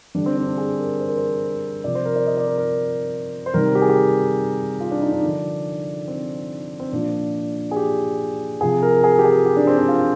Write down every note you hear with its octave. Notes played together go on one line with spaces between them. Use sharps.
D3 G3 D4
C4
D4
D4
G#4
A#4
C5
A#4
C5
C3 F3 D5
C5
A#4
D5
D#5
D5
A#4
A#4
C5
C3 D#3 G3 A#4
G4
G#4
G4
F4
D4
D#4
D4
D3 F3
C4
C4
A#2 F3 D4
G#4
G4
C3 F3 G#4
A#4
G#4
G4
G#4
G4
D4
C4
D4
F4